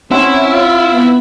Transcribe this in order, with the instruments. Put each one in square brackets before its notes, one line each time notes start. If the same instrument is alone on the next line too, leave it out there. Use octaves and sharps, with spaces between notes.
[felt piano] C4 F#5 C6 [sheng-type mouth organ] C#4 [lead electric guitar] E4
[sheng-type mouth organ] F4
[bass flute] B3